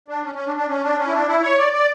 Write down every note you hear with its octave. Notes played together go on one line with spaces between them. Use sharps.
D4
C#4
C#4
D4
D4
C#4
D4
C#4
E4
D4
E4
C#5
D5
D5